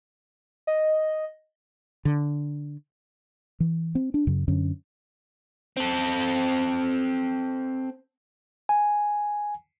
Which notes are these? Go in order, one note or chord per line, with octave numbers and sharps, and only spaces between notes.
D#5
D3
E3
C4
D4
F#2 C#3
F#2 D3 C#4
C4 A4
G#5